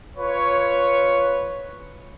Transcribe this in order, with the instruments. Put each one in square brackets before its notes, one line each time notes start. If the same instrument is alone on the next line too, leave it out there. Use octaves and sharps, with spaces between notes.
[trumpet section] F4 B4 C#5